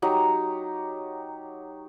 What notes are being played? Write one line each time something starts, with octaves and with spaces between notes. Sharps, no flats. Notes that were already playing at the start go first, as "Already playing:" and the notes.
F#3 D#4 G4 A#5